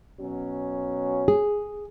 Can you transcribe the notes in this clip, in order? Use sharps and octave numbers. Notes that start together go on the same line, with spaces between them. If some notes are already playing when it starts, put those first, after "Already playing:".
B2 F#3 C#4
G#4